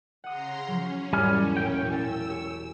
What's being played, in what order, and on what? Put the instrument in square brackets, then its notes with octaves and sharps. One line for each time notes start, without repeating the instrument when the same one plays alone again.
[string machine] C#3 A#5 C6 [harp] F#5 D#6
[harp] F3 F#3 [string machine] C#4
[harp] E1 G#2 E4 [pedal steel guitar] G3 G#5 F6
[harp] A1 A#2 [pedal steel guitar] G5
[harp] E1 G#5 A5 [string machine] E6
[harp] G4 C#5 G#5